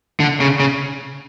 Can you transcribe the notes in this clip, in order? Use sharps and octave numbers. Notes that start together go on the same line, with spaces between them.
D3
C#3
C#3